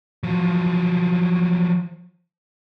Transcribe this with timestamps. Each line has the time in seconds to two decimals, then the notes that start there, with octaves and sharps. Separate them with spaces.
0.23 F3 F#3